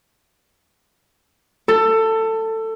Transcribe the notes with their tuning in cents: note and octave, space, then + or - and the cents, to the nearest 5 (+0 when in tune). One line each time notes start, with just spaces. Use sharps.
A4 +20